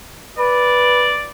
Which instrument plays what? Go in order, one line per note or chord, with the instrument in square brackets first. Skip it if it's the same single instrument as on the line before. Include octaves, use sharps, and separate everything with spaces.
[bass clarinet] B4 [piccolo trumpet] D5